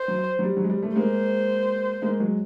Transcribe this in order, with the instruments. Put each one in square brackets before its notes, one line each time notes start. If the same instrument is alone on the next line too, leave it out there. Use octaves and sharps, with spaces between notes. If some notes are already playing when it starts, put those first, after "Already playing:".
Already playing: [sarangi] C5
[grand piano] F#3
F#3
G3
F#3
G#3
G3
G3 A3
[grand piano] G#3 A#3 [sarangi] C5
[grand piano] G#3 A#3
F#3 G#3